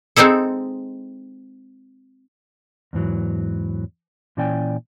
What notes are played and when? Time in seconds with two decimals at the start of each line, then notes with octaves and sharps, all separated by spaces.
0.16 G#3 C4 D#4 E4 A4
2.93 E2 G#2 E3 F#3
4.37 A#2 E3 C#4 D5 G5 G#5